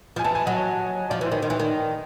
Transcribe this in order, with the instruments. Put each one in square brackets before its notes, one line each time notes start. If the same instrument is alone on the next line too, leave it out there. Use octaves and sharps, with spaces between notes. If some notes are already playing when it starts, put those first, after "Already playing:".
[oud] F3
[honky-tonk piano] G#5
[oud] E3 [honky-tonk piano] A5
[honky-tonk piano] G#5
[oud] F#3 [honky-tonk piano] D#5
[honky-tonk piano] C#5
[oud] F3 [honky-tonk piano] D5
[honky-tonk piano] C#5
[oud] E3
[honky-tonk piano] C5
[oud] D#3 [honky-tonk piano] C#5
[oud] D#3
E3
D#3